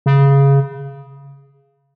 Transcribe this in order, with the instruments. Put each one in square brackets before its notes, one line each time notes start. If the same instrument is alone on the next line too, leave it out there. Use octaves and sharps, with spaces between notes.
[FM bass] C#3